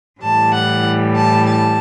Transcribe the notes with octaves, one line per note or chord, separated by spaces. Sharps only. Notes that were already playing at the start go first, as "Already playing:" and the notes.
A2 E3 G3 A5
F#5
A5
A5